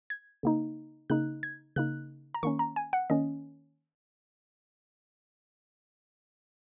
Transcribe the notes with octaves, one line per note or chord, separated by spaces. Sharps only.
G#6
C#3 A#3 D#4
C#3 A#3 D#4 F#6
G#6
C#3 A#3 D#4 F#6
A#5
D#3 A#3 C#4 C#6
A#5
G#5
F#5
D#3 A#3 C#4 D#5